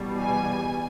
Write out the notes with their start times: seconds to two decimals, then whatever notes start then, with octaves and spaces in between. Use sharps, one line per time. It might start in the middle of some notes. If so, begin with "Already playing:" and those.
Already playing: E2 B2 G3
0.21 G#5